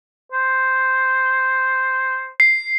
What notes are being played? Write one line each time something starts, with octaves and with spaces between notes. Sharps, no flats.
C5
C7